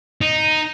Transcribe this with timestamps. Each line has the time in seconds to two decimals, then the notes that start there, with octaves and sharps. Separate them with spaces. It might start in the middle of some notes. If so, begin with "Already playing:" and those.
0.21 D#4